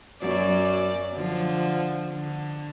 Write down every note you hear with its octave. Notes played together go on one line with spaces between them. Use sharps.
F#2 F#3 D5
D3 F3
D3